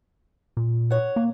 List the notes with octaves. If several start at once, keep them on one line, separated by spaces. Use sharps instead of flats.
A#2
C#5 F#5
A#3